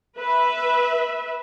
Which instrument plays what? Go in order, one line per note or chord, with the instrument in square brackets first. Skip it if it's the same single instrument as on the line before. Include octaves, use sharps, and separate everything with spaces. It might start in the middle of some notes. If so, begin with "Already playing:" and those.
[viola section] B4 E5